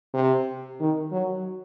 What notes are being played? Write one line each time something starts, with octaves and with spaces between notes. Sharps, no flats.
C3
D#3
F#3